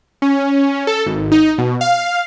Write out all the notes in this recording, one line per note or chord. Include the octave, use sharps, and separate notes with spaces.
C#4
A4
G#1
D#4
B2
F5